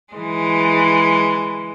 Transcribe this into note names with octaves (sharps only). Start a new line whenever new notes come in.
E3 G#3